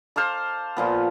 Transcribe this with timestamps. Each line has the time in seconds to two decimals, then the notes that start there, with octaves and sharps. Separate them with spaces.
0.16 C5 F5 A5 D6
0.77 A#2 F3 B3